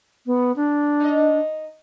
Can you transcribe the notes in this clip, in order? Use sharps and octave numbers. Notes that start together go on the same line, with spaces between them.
B3
D4
D#4 D#5